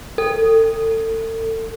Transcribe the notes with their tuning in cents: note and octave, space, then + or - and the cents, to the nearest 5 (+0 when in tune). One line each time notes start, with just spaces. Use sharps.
A4 +35